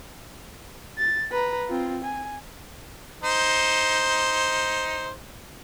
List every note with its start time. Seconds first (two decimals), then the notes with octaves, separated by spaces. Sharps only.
0.98 A6
1.31 B4 A#5
1.69 C4 F4
2.04 G#5
3.23 D#4 C5